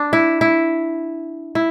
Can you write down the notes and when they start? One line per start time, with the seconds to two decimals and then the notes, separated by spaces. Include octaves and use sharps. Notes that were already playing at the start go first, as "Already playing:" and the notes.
Already playing: D4
0.13 E4
0.41 E4
1.55 E4